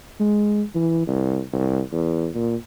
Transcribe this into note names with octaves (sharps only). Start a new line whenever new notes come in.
G#3
E3
C2
C2
E2
A#2